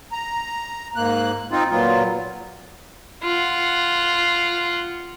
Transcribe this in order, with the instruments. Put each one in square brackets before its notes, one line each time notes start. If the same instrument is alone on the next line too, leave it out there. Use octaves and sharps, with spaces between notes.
[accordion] A#5
G#2 A#3 F#6
C4 D#4 F4
A#2 F#3 A#3 B3 F4
[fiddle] F4 F#5